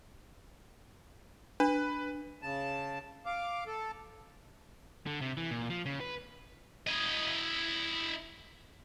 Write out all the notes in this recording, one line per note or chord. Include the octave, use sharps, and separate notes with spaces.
D4 B4
C#3 A5
F5 D6
A4
D3
C3
E3
A#2
F3
C#3
B4
E4 D#5